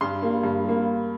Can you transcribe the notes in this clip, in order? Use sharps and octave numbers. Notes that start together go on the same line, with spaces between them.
G2 C6
G3 A#3
G2
G3 A#3